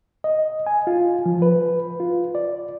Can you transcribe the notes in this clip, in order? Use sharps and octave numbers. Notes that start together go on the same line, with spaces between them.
D#5
G#5
F4
F3
B4
F4
D5